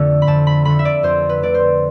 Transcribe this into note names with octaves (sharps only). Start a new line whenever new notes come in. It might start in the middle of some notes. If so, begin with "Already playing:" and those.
Already playing: F2 D3 A3
B5
F2 A5
B5
D3 A3 B5
E5
D5
F2 C5
B4
D3 A3 D5
C5